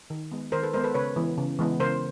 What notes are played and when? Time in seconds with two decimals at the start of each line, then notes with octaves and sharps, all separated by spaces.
0.10 D#3
0.32 G#3 B3
0.52 D#3 A#4 C5
0.63 A4 B4
0.74 G#3 B3 A#4 C5
0.84 A4 B4
0.94 C#3 B4 C#5
1.16 E3 G#3 B3
1.38 C#3
1.59 E3 G#3 B3
1.80 C#3 A#4 C5